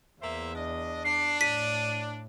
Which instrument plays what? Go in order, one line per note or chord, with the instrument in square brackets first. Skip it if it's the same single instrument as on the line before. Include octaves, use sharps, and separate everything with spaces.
[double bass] E2 [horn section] A#3 C5 E5
[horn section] D4 D#5
[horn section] D4 [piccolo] C7
[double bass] A2 [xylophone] B6 [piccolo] D#7